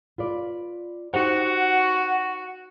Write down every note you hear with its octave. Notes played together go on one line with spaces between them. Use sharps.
F4 B4 D5
D#4 F#4 G4 C5 F#5